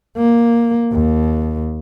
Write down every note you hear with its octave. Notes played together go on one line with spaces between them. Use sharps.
A#3
D#2